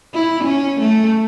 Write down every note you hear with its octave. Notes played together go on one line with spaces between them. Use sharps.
E4
C#4
A3